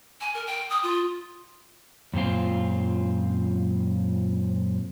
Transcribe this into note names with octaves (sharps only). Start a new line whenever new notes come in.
G#5
A#4
G5
D#6
F4
F#2 A#2 C4 F4